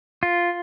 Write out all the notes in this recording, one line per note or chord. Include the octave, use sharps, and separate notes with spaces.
F4